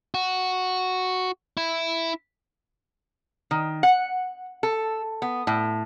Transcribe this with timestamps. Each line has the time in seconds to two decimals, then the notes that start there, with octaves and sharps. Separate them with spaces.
0.14 F#4
1.57 E4
3.51 D#3
3.83 F#5
4.63 A4
5.22 B3
5.47 A2